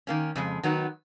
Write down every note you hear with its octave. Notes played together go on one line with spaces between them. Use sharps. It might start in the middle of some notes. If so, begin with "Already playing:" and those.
D#3 A#3 C#4
F2 C#3 G#3
D#3 F#3 B3 D#4